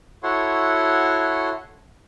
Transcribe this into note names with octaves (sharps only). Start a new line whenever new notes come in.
E4 F#4 A4 C#5 F#5 C6